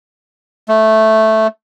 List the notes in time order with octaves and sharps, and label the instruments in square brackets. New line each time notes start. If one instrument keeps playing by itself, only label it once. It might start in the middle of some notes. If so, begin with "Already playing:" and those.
[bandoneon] A3